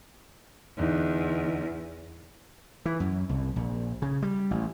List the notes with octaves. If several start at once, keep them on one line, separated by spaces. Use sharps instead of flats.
E2 D3 E3 D#4
E3
F#2
C2
A#1
C#3
G3
A1